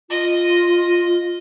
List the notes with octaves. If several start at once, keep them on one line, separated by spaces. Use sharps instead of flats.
F4 D#5